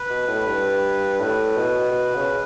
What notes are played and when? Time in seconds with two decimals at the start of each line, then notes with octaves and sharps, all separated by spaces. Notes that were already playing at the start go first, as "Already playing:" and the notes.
Already playing: B4
0.10 B2
0.28 A2
0.46 G2
1.19 A2 B4
1.56 B2
1.91 B2
2.15 C#3